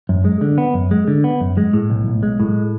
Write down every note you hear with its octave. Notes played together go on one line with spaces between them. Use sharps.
F#2
G#3
D3
B3
F#2
G#3
D3
B3
F#2
G#3
A2
B1
B1
G#3
A2